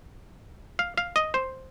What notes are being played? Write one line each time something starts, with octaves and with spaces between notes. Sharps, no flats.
F5
F5
D#5
C5